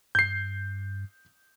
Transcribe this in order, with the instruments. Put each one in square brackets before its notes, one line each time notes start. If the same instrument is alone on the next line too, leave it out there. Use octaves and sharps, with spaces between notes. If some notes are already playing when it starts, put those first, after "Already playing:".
[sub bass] G2 [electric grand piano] G6 C7